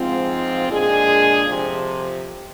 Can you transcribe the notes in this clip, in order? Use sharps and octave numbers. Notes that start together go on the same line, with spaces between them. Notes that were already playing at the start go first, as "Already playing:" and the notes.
Already playing: G#2 F3 G#3 C4 F4
A#2 G#3 D4 G#4
F2 C3 F3